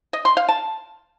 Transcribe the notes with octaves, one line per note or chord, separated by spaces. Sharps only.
D#5
C6
F5
A5